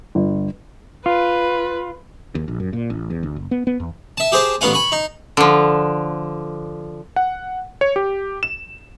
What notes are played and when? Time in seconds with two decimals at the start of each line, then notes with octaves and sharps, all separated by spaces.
0.15 G1
1.06 F4 B4
2.35 D#2
2.48 A#1
2.60 F#2
2.73 A#2
2.90 A1
3.10 E2
3.23 D2
3.36 F#1
3.51 B3
3.67 B3
3.80 E2
4.18 E5 A5
4.32 G4 G#4 C5 A5
4.61 A1 B3 C#4 F5 F#5 G#5
4.73 G#5 B5 C#6
4.92 D#4
5.37 D3 F3
7.16 F#5
7.81 C#5
7.96 G4
8.43 E7